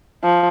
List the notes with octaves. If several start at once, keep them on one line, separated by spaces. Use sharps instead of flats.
F3